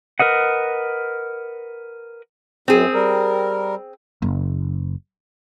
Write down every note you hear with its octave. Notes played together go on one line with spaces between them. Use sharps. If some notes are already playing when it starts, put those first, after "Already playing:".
A#4 B4 D#5 F#5
F#2 C4 G#4
G3 A#4
F#1